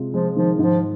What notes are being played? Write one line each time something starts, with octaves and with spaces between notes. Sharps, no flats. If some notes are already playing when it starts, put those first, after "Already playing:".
Already playing: C3 G#3 F4
F3 G#3
D#3 F3
G#2 F3